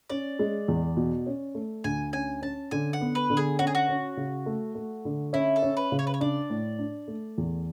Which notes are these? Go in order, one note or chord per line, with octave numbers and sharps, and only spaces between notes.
C#4 D5
G#3
E2
B2
C#4
A3
D2 G#5
C#4 G#5
C#4 A5
D3 G#5
F#5
B3
B4
D3
G#4
C#4 F#4
G#4
F#4
C#4
C#3
A3
A3
D3
C#4 E4
A4
C#4
B4
C#3
C#5
B4
C#5
D4 D5
A2
D4
A3
E2